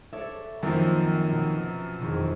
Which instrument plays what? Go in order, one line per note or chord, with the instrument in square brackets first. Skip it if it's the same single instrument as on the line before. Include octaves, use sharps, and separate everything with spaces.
[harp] A4 C#5 D5 [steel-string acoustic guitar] E5
[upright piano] F#2 F3 [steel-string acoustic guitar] D#3 A#3 [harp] C4
[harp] B2
[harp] E1 F2 [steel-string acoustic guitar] D#3